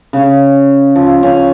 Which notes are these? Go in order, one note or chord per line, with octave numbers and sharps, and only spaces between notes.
C#3
F3
C#4